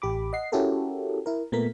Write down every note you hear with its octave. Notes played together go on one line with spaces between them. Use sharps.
A1 G4 B5 D6
D#5 F#5 C7
C#4 E4 F#4 G4 A4 A#4
E4 A#4
A#2 A3 B3 A#4 B6